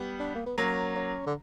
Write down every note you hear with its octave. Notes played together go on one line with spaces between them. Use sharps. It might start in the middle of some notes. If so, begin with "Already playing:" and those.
Already playing: G3 B3
D4
A#3
B3
F#3 A#3 C#4
C#4
D3